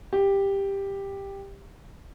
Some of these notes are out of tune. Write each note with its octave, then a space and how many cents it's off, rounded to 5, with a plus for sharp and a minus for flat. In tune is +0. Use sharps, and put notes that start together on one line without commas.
G4 +10